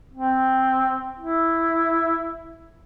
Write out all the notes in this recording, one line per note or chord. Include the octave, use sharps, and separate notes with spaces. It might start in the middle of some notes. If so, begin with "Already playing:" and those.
C4
E4